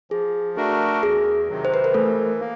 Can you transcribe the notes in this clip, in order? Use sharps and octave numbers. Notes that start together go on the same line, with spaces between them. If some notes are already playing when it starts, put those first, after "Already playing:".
F3 G#4
A3 D4 F#4 A#4
E2 G#4
C3 D#3 F#3
C5
B4
A#4
E3 A3 A4
A#3